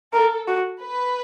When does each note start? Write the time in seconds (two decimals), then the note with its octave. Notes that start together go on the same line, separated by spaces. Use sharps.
0.13 A4 A#4
0.47 F#4
0.82 B4